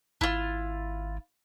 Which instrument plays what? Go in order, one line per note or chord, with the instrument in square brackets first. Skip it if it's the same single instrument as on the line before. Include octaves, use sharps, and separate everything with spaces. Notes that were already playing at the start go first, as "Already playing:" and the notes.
[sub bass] G#1 [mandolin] E4 F4